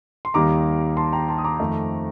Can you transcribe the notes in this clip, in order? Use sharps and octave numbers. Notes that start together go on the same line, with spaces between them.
C6
D#2 D#3 G3 A#3 A#5 D6
A5 C6
G5 A#5
A5 C6
D#6
A#5 D6
F2 D#3 A3 C4